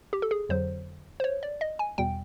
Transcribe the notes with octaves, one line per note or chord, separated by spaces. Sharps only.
G4
A4
G#4
F2 D3 F#3 C5
C5
C#5
D5
D#5
G#5
E2 B2 G3 G5